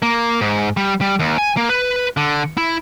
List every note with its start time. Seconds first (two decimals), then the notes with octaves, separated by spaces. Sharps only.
0.02 A#3
0.41 G#2
0.77 G3
1.01 G3
1.19 D#2
1.38 G#5
1.57 A#3
1.69 B4
2.17 D3
2.57 E4